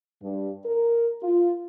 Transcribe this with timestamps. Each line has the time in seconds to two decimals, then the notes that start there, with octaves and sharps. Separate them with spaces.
0.23 G2
0.66 A#4
1.23 F4